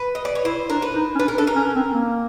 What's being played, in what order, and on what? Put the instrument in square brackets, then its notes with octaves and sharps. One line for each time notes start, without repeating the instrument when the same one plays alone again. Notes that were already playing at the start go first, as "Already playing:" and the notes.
Already playing: [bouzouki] B4
D#5
D5
C#5
[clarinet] E4 [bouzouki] C5
[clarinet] D4 [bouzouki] A#4
[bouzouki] B4
[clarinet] D#4
C#4
[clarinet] D4 [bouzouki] B4
[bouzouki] A#4
[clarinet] D4 [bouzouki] A4
[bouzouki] A#4
[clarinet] C#4
C4
A#3